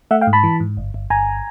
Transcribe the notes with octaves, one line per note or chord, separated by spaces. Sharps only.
A3 E5 F#5
F5 G5
G#2
A5 B5
E3
G#2
G1
G1
G1 G#5 A#5